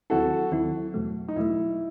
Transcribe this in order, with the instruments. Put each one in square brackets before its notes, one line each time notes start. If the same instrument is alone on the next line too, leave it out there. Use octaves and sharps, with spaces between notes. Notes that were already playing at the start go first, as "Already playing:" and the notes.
[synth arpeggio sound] D#2 D#3 F#3 C4 E4 [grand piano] F#4 A4
[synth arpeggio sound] D#2 D#3 F#3 C4 E4
E2 B2 F#3 A3
[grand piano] D#4
[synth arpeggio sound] E2 B2 F#3 A3 [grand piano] E4